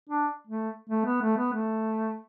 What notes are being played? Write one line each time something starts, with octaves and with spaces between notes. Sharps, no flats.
D4
A3
A3
B3
A3
B3
A3